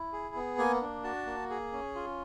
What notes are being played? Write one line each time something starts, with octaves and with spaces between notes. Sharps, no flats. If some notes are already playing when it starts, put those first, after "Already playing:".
Already playing: E4
G#4
B3
A#3 G#5
D4
F#4 A5
A#3
G#4
C#4
F4